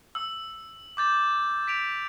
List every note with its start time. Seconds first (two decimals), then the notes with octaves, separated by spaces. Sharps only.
0.15 E6
0.97 D6 G6 A6
1.67 B6 D7 F7